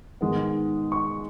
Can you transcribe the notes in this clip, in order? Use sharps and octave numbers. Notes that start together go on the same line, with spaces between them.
G#2 D#3 G#3 B3
C#6